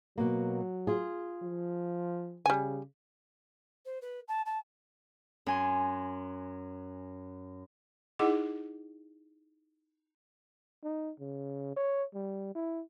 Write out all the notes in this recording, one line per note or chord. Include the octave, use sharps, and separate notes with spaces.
B2 F#3 A#3
F4 G#4
F3
C#3 G3 G#5
C5
B4
A5
A5
F#2 G#5 C6
D#4 E4 G#4 D#5 F#5 D6
D#4
C#3
C#5
G3
E4